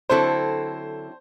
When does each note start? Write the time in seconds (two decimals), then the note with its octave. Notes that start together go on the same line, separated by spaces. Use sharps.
0.09 D3 F#3 C4 E4 A4 C5